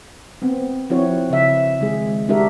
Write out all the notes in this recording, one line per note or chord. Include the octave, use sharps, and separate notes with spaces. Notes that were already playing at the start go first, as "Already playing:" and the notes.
B3 C4
F3 C4 E4 F#4 C#5
C#3 E5
D#3 G#3 G#4
G#3 D4 F#4 G4 A#4 E5